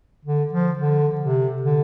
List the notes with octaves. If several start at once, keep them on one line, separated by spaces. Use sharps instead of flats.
D3
F3
D3
C3
D3